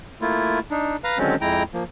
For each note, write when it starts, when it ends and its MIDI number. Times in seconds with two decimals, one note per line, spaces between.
0.22 0.59 57
0.22 0.59 58
0.22 0.59 64
0.22 0.59 65
0.71 0.96 62
0.71 0.96 63
1.04 1.18 71
1.04 1.18 77
1.04 1.18 82
1.18 1.36 50
1.18 1.36 51
1.18 1.36 54
1.18 1.36 56
1.18 1.36 60
1.18 1.36 61
1.41 1.63 41
1.41 1.63 56
1.41 1.63 64
1.41 1.63 79
1.41 1.63 82
1.74 1.84 53
1.74 1.84 58